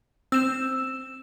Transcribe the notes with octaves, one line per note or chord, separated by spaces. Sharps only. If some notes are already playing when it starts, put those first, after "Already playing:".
C4 E6 E7